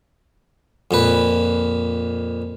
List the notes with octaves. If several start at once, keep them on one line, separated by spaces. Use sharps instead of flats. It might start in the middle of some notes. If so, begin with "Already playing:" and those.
F2 A#2 B4